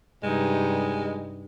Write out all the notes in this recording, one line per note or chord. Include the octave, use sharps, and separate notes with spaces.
G2 C3 G#3 D#4